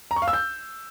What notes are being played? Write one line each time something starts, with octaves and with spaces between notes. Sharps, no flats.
A#5
C#6
F5
E6
G6